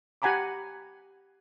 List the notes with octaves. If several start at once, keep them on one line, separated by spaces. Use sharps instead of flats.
G4 F#5 G#5 A#5 B5 D6